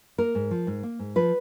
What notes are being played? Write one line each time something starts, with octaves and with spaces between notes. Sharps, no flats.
A#3 A#4
G#2
F3
G#2
A#3
G#2
F3 B4